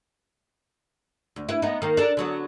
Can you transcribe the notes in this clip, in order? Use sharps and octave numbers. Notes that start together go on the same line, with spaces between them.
D2
E4 B4
B3 D#4
D#3 A#3
D4 A4 A#4
D3 F#3 B3